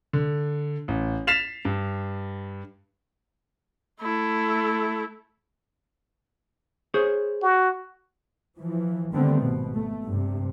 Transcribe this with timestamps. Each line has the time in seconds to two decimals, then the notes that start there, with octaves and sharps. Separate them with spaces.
0.13 D3
0.88 A1
1.27 A6 B6 C7 E7 F7
1.65 G2
4.01 A3 E4
6.94 G#4 C5 C#5
7.42 F#4
8.59 E3 F3
9.14 D3 D#3 G3 A3 B3 C4
9.43 G#1 B2
9.75 A3
10.06 G2 C3